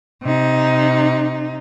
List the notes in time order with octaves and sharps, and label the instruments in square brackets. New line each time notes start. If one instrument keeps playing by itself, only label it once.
[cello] C3 D#4